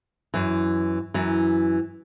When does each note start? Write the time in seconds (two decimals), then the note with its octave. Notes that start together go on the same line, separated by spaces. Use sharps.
0.34 F#2 E3
1.14 F#2 E3